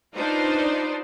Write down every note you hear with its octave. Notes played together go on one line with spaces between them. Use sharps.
D4 D#4 F4 B4 C5 D5